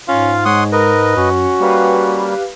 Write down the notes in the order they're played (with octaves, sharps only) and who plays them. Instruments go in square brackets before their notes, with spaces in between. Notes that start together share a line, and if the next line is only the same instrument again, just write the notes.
[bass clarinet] G#2 [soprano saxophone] C#4 [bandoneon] F4 F5
[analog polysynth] G#3 [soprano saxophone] C#5 [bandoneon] F#5 C6 D#6
[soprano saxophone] A#4 [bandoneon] B4 D#5
[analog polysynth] F#2 [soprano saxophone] C#4 [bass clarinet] F#4
[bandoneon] G3 A#3 [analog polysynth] G4 B4 F5